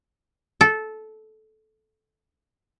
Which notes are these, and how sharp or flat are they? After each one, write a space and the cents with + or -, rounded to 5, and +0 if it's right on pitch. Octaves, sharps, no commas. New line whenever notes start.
A4 -15